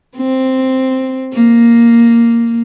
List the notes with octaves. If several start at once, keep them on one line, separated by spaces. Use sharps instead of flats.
C4
A#3